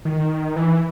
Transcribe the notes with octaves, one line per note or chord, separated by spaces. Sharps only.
D#3
E3